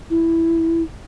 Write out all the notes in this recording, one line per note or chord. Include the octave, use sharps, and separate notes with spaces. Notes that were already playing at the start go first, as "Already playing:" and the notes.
E4